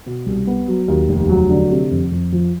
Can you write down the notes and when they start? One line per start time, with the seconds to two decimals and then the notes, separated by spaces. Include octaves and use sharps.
0.06 B2
0.26 C2
0.47 B3
0.68 F#3
0.88 D#2
1.09 F1
1.29 F#3
1.50 D3
1.71 C3
1.91 F2
2.12 F2
2.32 F3